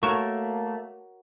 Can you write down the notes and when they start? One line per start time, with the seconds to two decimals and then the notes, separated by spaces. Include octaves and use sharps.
0.03 A3 A#3 F#4 A#4 C#5 C#6 E7